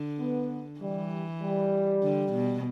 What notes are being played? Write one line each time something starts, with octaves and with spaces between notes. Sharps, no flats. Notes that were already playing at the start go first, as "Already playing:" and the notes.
Already playing: D3
B3
E3 G3
G3
D3
B2